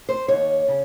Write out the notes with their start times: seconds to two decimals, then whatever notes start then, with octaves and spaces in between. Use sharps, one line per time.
0.09 C5
0.28 D#2 C#5
0.68 C#3